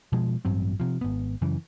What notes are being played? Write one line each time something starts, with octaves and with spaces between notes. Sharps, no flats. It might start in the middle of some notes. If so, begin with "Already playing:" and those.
B2 F3 G#3
A1 G2 F#3 C4
C3 F3
G#1 B3
F#2 C#3 E3